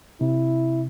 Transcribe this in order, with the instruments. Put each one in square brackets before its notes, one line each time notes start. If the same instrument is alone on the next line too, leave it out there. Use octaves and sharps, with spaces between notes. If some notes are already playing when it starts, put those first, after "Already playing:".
[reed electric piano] C3 [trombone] E4